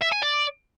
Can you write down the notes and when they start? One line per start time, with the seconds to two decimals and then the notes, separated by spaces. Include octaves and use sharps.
0.02 E5
0.12 G#5
0.23 D5